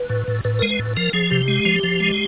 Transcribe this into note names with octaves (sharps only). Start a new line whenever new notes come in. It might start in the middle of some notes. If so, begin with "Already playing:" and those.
Already playing: B4
A2
A2
A2 B4
G#3 A#4
B4
A2
F3 A#4
F3 G#4
C3 G4
G#3
F3
F3
G#3